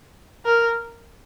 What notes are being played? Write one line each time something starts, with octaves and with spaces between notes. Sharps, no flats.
A#4